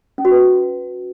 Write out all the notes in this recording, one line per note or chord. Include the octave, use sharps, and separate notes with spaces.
C#4
F#4
B4